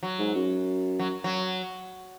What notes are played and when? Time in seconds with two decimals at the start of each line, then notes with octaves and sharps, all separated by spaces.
0.03 F#3
0.19 G#2
0.35 F#2
0.99 F#3
1.24 F#3